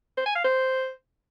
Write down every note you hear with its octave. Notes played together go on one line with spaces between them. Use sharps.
C5
G#5
F5
C5